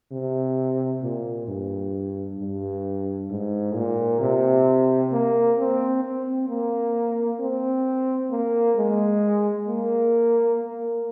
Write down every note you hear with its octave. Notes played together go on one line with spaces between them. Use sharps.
C3
A#2
G2
G2
G#2
A#2
C3
A#3
C4
C4
A#3
C4
A#3
G#3
A#3
A#3